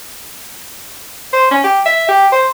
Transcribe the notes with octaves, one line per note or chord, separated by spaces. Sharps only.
C5
C#4
G4
E5
G4
C5